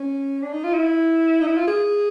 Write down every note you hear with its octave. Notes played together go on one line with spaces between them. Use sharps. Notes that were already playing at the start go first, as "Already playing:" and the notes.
Already playing: C#4
D4
D#4
F4
E4
D#4
E4
F4
G#4